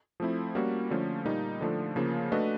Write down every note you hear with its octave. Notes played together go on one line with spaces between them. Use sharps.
F3 A3 C4 E4
G3 A#3 C#4 F#4
D3 F3 A3 C#4
A#2 G3 A#3 D#4
D3 F3 A3 D4
C#3 F3 A#3
A3 D4 F#4 B4 D#5